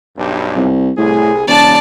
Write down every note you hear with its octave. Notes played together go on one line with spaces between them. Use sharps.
B1 G2
C2
C2 A2 G#4
E1 C#3 D5 A5